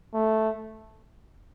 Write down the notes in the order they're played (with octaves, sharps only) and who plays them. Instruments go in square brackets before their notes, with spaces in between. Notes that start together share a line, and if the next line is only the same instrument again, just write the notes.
[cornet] A3